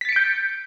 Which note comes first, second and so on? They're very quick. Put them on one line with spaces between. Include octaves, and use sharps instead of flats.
B6 A6 C#7 D7 G6